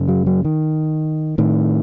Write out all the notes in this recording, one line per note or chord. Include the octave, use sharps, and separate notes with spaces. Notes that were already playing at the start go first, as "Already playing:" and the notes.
Already playing: F#2 C#3
F#3
F#3
D#3
A2 D#3